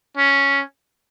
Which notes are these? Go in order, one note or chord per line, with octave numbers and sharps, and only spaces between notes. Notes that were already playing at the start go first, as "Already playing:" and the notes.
C#4